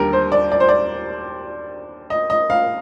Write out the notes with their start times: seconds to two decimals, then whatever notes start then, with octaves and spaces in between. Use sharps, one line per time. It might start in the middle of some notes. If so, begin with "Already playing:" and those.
Already playing: D#2 D3 G3 G4 A#4
0.13 C5
0.32 D5
0.52 D5
0.60 C5
0.69 D5
2.10 D#5
2.30 D#5
2.50 F5